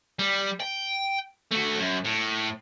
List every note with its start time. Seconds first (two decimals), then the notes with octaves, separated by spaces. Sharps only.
0.19 G3
0.60 G5
1.51 A3 F#4
1.78 F#2
2.04 A2